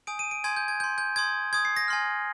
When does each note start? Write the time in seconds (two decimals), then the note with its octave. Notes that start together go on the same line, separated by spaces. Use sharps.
0.07 G#5 D#6 G6 D7
0.19 D#7
0.31 D7
0.44 G#5 C6 D#6 G6 G#6
0.56 G6
0.68 G#6
0.80 C6 G6
0.98 G6
1.16 C6 D#6 G6 G#6
1.53 C6 D#6 G6 G#6
1.65 C7
1.77 A#6
1.88 G#5 C6 F6